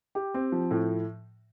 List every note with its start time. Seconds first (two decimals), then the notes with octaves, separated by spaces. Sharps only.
0.15 G4
0.34 C4
0.52 F3
0.71 A2